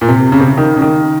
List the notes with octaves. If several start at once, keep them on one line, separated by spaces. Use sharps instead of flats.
A#2
C3
C#3
C3
C#3
D#3
C#3
D#3